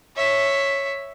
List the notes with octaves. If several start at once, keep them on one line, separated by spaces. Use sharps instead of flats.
C#5 E5